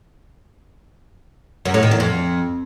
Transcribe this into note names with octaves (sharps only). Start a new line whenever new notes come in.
F#2
A2
D#3
E2
F2